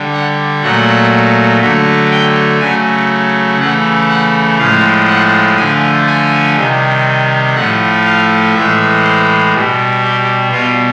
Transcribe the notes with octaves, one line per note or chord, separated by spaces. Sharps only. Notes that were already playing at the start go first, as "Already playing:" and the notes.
Already playing: D3 G3
F#5
A#2 F#3 A3 F#5
D3 F#3 A3
G5
C#3 F#3 A3 G#5
C#3 E3 A3 F#5
F#5
A2 F3 G#3 F5
F#5
D3 F3 A3 G#5
G#5
C3 D#3 G3
A2 F3 A3 F#5
F5
A2 E3 G#3 E5
C5
B2 G3
G4
B2 G3 F4